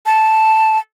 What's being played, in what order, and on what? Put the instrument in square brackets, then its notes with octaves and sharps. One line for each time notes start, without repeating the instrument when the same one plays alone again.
[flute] A5